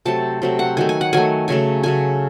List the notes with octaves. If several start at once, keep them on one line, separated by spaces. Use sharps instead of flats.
C3 F#3 A3 A5
C3 F#3 A3
F#5
D#3 F#3 A3 G#5
G#5
F#5
D#3 F#3 A3 G#5
C#3 F#3 A3 G#5
C#3 F#3 A3 G#5